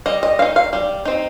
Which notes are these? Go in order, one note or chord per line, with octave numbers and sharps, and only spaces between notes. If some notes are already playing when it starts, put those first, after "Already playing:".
G3 D#5
D#5
C4 D#4 F5
F5
G3
C4 D#4